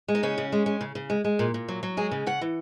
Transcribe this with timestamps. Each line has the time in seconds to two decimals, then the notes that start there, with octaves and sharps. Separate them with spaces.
0.08 G#3
0.15 D#4
0.23 C#3 C#4
0.38 C#3
0.52 G#3
0.66 G#3
0.81 C#3
0.95 C#3
1.10 G#3
1.24 G#3
1.39 A#2
1.54 A#2
1.68 F#3
1.83 F#3
1.97 G#3 G#4
2.11 C#3
2.26 C#3 F#5
2.41 E3